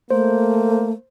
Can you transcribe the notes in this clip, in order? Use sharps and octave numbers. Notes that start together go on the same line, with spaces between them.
A3 A#3 C5